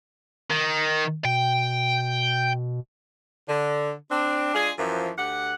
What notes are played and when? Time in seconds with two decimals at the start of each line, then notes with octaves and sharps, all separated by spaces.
0.50 D#3
1.25 B2 G5
3.48 D3
4.11 C4 D4
4.54 G#3 D4 F4 G#4
4.78 F#2 E3 F3
5.18 D2 G4 F#5